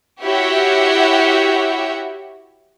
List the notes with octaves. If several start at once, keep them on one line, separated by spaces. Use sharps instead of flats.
E4 F#4 G4 C#5 E5 F#5